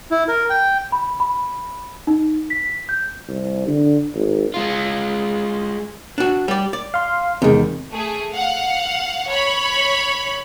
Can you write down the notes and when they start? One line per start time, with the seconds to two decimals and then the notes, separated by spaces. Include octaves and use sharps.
0.11 E4
0.28 A#4
0.50 G5
0.92 B5
1.20 B5
2.07 D#4
2.50 B6
2.89 G6
3.28 C2
3.68 D3
4.15 G#1
4.54 G#3 F4
6.18 D4 F#4
6.48 G3 D5
6.73 D5
6.94 F5 C6
7.42 E2 C3 D#3 G#3
7.91 A3 G#4
8.33 F5 F#5
9.27 C#5 B5